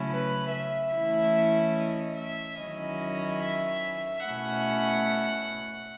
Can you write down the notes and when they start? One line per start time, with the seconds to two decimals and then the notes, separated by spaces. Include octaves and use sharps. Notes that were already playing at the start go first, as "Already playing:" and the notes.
Already playing: C#3 F#3 A3 C#4 E4
0.09 B4
0.50 E5
0.92 E3 A3 C#4 E4
1.75 D#5
2.16 E5
2.58 D#3 F#3 C#4 E4 D#5
3.41 E5
4.24 B2 A3 C#4 E4 F#5